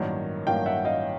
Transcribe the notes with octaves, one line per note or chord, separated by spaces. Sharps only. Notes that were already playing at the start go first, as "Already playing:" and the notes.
Already playing: A1 G2 D#3 F#3 A#3
A1 G2 D#3 F#3 A#3 F5 G5
E5 F#5
D#5 F5